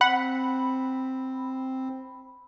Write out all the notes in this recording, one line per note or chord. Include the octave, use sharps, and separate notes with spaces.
C4 F#5 B5